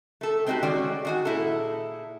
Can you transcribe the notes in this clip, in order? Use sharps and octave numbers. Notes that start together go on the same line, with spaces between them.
A3 A4
G#3 C4 D#4 E4 F#4 G4
D#3 G#3 C#4 F#4 D5
D#3 F#4 G#5
A#2 E4 G#4 A4